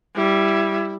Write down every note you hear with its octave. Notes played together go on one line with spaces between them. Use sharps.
G3 E4